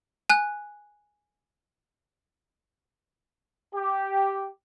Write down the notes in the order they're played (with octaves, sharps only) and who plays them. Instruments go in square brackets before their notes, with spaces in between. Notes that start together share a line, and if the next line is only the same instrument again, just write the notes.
[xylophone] G#5 F#6
[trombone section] G4